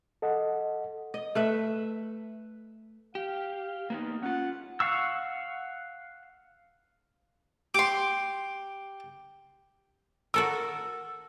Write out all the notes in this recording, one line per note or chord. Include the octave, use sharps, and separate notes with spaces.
A4 D#5 F#5
D#5
A3 B4 E5
G4 F5
A#3 B3 D#4
C#4 F4 F#5
F5 F#5 C#6 E6
G4 C6 D6
F#4 A4 A#4 E6